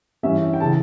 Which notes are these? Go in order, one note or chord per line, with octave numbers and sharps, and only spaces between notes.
G2 E3 G3 C#4 E5
G5
C#3 E3 A5